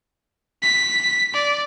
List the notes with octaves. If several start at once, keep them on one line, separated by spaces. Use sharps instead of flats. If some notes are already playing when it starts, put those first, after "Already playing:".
B6
D5